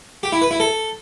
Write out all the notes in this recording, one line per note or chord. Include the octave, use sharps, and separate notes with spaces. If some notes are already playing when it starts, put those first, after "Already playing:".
G4
E4
B4
E4
A4